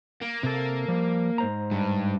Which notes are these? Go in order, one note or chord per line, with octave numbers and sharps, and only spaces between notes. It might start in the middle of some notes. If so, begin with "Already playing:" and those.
A#3
C3 A4
F3 G3
G#2 C5 A#5
G2